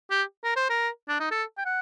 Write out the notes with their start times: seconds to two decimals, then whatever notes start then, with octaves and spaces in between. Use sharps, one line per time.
0.11 G4
0.44 A#4
0.56 C5
0.70 A#4
1.09 D4
1.20 D#4
1.31 A4
1.58 G5
1.66 F#5